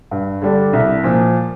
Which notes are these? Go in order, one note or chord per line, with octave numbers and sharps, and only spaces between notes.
G2
D3 G3 D4
C2
A#2 F3